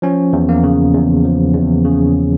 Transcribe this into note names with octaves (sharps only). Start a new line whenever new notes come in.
F3 C#4
E2
A#3
C#3
E2
F3
E2
C#3